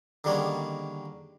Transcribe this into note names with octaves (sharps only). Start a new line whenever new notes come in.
D3 D#3 G3 G#3 A#3 C#4